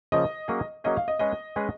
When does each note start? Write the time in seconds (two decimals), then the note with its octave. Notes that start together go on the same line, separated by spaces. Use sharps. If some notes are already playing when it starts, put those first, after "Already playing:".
0.12 C#3 F3 A#3 D#5
0.48 F#3 A#3 C#4 G#4
0.84 F#3 A#3 C#4 G#4 D#5
0.97 F5
1.08 D#5
1.19 G#3 C#4 G#4 B4 D#5
1.56 G#3 C#4 G#4 B4